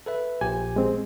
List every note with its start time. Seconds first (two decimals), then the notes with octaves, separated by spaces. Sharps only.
0.06 A4 B4 E5
0.41 A#1 A#2 G4 G#5
0.76 G#3 C4